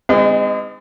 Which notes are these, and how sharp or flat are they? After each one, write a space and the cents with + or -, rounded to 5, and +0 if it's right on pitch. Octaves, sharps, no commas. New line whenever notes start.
G#3 -35 C4 -45 D#4 +0